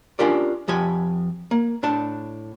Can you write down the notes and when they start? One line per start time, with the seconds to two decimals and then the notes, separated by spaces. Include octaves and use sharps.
0.19 C#4 D4 F4 G4 A#4 D5
0.68 F2 F3 G4 G#5
1.51 A#3
1.83 A2 D4 A5